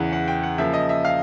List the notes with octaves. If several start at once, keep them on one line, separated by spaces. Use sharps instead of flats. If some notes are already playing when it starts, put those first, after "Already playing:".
Already playing: E2 C#3 E3 F#5
F#5
G5
F#5
C#3 F3 A#3 E5
D#5
E5
F5